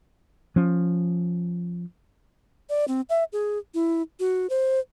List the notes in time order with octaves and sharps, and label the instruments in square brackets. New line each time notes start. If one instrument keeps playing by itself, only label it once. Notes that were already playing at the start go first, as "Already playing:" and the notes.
[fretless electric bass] F3 C#4
[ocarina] D5
C4
E5
G#4
E4
F#4
C5